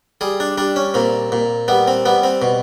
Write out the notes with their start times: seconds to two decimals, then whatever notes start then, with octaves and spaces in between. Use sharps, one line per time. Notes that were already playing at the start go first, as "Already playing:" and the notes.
0.21 G3 G#4
0.40 D4
0.58 G3 D4
0.76 C#4
0.94 A#2 C4
1.32 A#2
1.68 G3 B3
1.88 C4
2.05 G3 B3
2.23 C4
2.42 B2